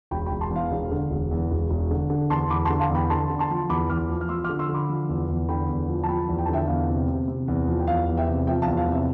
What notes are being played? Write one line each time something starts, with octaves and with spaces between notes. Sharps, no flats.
E1 G5 B5
G5 B5
E1
A5 C6
E2
F5
E1
D3
E1
E2
E1
E1
D3
D3
E2 A5 C6
E2 B5 D6
A5 C6
D3
F5 A5
E2
G5 B5
D3 A5 C6
D3
A5 C6
F3
E2 B5 D6
E2 D6 F6
F3
F6
F3 C6 E6
D6 F6
D3
C6 E6
D3
B5 D6
F3
E2
E2
D3 G5 B5
E2
F3
A5
F3 G5 B5
E2
G5
A5
D3 E5 G5
E2 F5
C3
C3
C3
E2
F3
G5
E2 F5
E2
E5 G5
C3
F3 E5 G5
F5 A5
E2
F5
C3
E5